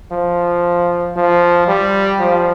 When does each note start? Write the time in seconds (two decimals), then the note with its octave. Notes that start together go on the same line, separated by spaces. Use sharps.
0.12 F3
1.17 F3
1.68 G3
2.20 F3